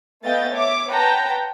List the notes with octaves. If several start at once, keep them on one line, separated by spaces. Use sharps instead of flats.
A3 B3 D#5 F5 G5 A6
C#5 E5 D6
B4 C#5 F#5 G5 A5 A#5